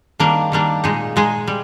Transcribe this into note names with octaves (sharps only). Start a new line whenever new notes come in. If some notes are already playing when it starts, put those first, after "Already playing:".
D#3 G3 A#3 D4
D#3 G3 A#3 D4
A#2 G#3 D#4 G#4
A#2 G#3 D#4 G#4
G3